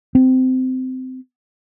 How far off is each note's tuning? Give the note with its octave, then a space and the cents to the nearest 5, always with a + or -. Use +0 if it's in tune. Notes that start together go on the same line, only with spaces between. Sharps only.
C4 -20